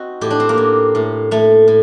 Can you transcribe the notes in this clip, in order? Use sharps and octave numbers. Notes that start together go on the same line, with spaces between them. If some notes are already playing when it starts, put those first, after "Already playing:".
Already playing: C4 D#4 F#4
A2 G4
D4
C4
A#3
A2
A2
A2 A3
A2